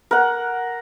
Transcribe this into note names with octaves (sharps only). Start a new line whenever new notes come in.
A#4 F#5